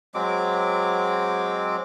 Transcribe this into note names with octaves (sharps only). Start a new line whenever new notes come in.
F#3 G#3 C4 D6